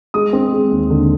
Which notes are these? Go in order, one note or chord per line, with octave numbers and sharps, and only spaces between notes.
G#3 D#6
C4
G#3
D#2
D3